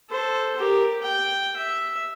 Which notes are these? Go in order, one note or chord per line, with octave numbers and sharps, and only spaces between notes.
A4 C5
G4 A#4
G5
E5